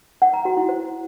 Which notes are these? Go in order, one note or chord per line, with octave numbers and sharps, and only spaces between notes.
F#5
A#5
F#4
E4
C5